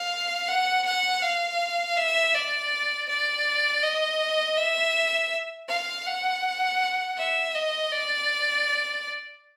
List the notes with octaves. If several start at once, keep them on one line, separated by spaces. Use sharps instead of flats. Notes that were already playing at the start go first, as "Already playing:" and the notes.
Already playing: F5
F#5
F#5
F5
E5
D5
D5
D#5
E5
F5
F#5
E5
D#5
D5